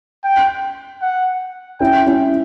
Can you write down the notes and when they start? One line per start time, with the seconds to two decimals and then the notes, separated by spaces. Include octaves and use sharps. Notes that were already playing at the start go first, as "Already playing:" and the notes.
0.24 G5
1.02 F#5
1.80 C#4 E4 G5
2.06 C#4 E4